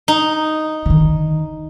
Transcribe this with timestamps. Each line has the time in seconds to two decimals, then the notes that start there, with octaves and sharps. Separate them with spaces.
0.08 D#4
0.86 D3 D#3